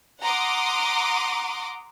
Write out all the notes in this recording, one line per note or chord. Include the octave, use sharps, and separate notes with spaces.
F#5 A#5 C6 D6 D#6